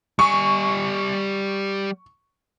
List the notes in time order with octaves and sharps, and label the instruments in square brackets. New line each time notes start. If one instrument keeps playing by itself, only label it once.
[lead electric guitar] G3 G#5 [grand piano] C#6